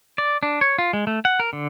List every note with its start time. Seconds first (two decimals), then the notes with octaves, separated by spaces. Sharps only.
0.18 D5
0.43 D4
0.61 C#5
0.78 F4
0.93 G#3
1.07 A3
1.25 F#5
1.40 A#4
1.53 D3